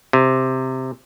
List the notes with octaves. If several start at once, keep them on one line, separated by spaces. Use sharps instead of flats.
C3